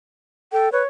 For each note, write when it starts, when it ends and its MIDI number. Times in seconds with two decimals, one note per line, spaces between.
0.52 0.69 69
0.52 0.71 79
0.72 0.82 71
0.72 0.86 73